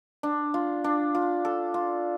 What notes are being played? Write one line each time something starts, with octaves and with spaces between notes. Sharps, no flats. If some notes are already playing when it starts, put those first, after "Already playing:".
D4
F4
D4
F4
A4
F4